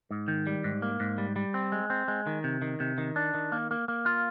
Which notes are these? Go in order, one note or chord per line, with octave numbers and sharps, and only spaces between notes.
G#2
D#3
G3
G#2
A#3
G#2
G3
G3
C4
G#3
C4
G#3
D#3
C3
D#3
C3
D#3
D4
D#3
A#3
A#3
A#3
F4